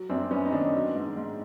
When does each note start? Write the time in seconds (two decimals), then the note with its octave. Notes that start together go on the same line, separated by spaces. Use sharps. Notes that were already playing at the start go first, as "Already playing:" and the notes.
Already playing: F#3
0.09 F#2 C4 D4
0.31 F#2 B3 C#4
0.45 D#4
0.52 D#3 C4 D4
0.74 F#3
0.95 G#2
1.17 G#2